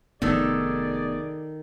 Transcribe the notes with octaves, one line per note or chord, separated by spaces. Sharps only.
F1 D#3 B3 G#4 A4 D5